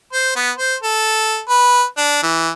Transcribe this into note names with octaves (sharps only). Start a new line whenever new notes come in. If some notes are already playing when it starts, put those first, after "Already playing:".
C5
B3
C5
A4
B4
D4
E3